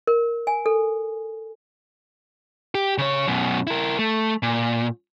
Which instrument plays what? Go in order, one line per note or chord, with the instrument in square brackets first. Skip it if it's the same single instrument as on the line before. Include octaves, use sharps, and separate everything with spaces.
[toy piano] A#4
G#5
A4
[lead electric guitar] G4
C#3 C#5
F#2 B2
E4 A#4
A3
A#2